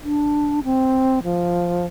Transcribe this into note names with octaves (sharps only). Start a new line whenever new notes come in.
D4
C4
F3